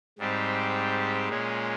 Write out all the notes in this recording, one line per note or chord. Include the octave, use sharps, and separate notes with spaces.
G#2 G3 C4 G4
A#2 G#3 C#4